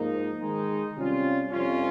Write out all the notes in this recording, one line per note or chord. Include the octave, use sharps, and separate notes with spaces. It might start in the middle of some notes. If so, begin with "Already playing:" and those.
Already playing: G#2 F3 A#3 D#4
D#3 G#3 D#4
C3 G3 C#4 F4
F2 C3 G3 C#4 F4